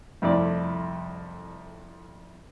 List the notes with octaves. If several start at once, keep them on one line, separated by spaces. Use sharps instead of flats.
C2 F2 A3 E4 D5